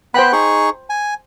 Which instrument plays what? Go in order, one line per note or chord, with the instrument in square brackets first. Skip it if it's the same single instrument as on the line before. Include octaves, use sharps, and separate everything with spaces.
[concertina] B3 F#6 [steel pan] C5 G5 B5
[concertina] D#4 G#4 C#6
G#5